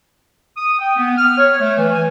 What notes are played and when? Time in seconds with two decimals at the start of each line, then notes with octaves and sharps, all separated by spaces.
0.57 D#6
0.79 G5
0.96 B3
1.17 F6
1.38 C#5
1.60 A3
1.78 E3
1.93 G#5